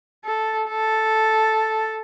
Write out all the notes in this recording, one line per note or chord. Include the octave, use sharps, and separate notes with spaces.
A4
A4